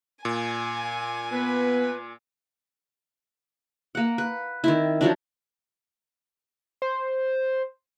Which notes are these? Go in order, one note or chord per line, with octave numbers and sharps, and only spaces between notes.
A#2 G#5
B3 B4
A#3 F#5
B4
D#3 C4 E4
F3 F#3 D4
C5